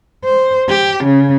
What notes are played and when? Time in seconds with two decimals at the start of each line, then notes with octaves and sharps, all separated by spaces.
0.25 C5
0.69 G4
1.04 C#3